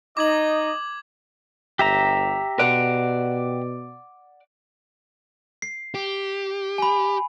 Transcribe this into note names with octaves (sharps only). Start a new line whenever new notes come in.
D#4 D#5 D6 G#6 F#7
G1 G4 E5 A#5
B2 D5 F#5
C7
G4
G#5 B5